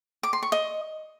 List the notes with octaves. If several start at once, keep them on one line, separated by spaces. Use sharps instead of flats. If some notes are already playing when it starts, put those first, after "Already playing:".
D6
C6
C#6
D#5